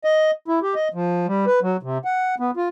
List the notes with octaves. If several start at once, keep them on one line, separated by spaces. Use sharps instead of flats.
D#5
E4
G4
D#5
F3
G3
B4
F#3
C3
F#5
B3
F4